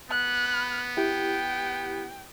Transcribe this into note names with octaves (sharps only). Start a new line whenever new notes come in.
B3 F#6
B5
E4 G4 G5